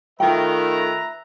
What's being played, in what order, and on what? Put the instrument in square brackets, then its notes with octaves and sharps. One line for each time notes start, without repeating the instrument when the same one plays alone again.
[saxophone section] D#3 A3 F4 [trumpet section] B4 E5 A#5 [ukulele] G5